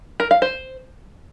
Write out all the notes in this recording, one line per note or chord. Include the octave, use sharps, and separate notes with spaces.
A#4
F5
C5